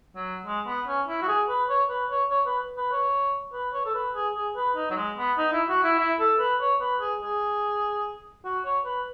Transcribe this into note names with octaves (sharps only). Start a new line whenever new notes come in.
F#3
G#3
B3
C#4
E4
F#4
G#4
B4
C#5
B4
C#5
C#5
B4
B4
C#5
B4
C#5
A4
B4
G#4
G#4
B4
D#4
F#3
G#3
B3
D#4
E4
F#4
E4
E4
A4
B4
C#5
B4
G#4
G#4
F#4
C#5
B4